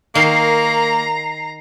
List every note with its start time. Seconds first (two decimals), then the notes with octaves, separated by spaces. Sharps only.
0.15 D#3 A#3 A#5 C7